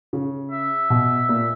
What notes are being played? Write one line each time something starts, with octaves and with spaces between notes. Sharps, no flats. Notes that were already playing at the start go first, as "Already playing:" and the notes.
C#3
E5
B2
A#2